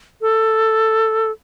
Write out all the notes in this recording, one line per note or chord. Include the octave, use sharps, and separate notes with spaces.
A4